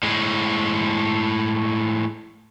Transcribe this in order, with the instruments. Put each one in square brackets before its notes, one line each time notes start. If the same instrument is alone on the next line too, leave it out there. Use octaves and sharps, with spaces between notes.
[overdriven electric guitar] A2 G#3